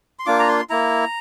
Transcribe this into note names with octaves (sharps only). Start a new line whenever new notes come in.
C6
A#3 D4 F4 D6
A#5
C6
A#3 E4 A#5